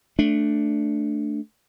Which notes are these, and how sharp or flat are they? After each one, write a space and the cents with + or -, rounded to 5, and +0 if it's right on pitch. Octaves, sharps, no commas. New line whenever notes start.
A3 +0 D4 +0